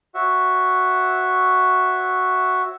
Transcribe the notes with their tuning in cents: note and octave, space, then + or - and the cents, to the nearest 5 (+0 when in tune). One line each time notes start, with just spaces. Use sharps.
F#4 +0 C#5 +0 E5 +0